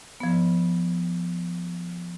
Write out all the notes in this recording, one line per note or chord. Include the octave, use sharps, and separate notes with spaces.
F3 B3